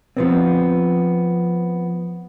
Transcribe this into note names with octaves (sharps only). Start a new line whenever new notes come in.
F3 B3 C4